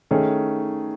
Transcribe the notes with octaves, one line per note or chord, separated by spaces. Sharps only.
D#3 A3 C#4 G#4 C#5